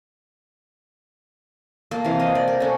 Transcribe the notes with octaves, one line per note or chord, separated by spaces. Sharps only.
A#3 A5
C3 E3 F5
D#5
D5
A#4
C#4 A4